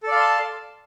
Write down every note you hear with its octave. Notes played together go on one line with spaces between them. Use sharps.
A4 D5 F5 A5 C6